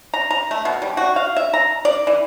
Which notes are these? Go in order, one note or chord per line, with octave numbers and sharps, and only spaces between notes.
A#5
A#5
A3
B2
G3
F#4
F5
E5
A#5
D5
E3